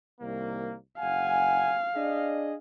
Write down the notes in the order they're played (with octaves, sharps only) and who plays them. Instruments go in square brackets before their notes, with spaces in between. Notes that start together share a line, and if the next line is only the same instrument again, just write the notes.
[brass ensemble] C2 D#3 A#3
[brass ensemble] F#1 F#5 G#5 [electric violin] F5
[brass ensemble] D4 G#4 D#5